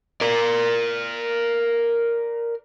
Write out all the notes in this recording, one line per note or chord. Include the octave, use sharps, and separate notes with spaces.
A#4 D5